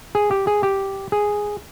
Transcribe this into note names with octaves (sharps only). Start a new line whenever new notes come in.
G#4
G4
G#4
G4
G#4